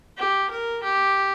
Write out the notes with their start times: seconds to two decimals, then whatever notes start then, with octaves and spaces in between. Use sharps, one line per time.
0.17 G4
0.50 A#4
0.83 G4